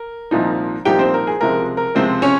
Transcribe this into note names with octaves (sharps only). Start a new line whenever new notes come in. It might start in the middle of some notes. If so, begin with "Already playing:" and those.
Already playing: A#4
C2 A#2 F3 C4 D#4
C2 A#2 F3 C4 D#4 G4 G5
C4 C5
A#4
G#4
C#2 C3 F3 G#3 A#4
A#4
C#2 C3 F3 G#3 C4 C5
C#4 C#5